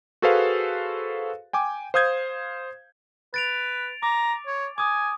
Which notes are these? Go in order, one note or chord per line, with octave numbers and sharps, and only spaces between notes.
F#4 G#4 A4 B4 C5 F5
G5 G#5 D6
C5 F5 D#6 G6 G#6
B4 A6 D7 F7
A#5 D6
C#5
G#5 D6 D#6